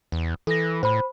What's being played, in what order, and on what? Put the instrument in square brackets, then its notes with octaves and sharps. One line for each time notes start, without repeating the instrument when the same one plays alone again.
[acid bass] E2
[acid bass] E3 [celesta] A4 A#6
[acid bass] A2 [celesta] C5 B5